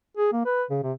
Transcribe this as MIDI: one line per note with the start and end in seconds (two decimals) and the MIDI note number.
0.17 0.31 68
0.33 0.41 58
0.46 0.64 71
0.70 0.78 49
0.83 0.92 48